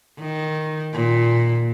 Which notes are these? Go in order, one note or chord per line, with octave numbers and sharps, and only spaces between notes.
D#3
A#2